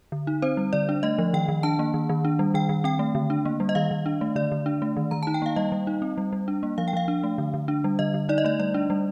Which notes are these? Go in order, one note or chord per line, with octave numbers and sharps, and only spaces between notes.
D3
D#4
C4 C5
G3
D3 D5
D4
A3 D#5
F3
D#3 G5
D#3
D4 A5
A#3
D#3
D#3
D4
G3
D#3 G5
D#3
C4 G5
A3
D3
D4
A#3
G3
D#5
D#3 F5
D#3
D4
A3
D3 D5
D3
D4
A3
D#3
D#3 A#5
D#4 A5
G5
A#3 F5
G3 D#5
G3
D#4
C4
G3
G3
D4
A#3
F3 F5
G5
F3 F5
D4
A3
D3
D3
D4
G3
D3 D#5
D3
D#4 D5
D#5
A3 D5
G3 D5
D4
G3